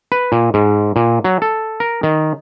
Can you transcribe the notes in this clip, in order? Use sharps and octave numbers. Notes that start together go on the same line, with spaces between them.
B4
A#2
G#2
A#2
F#3
A4
A#4
D#3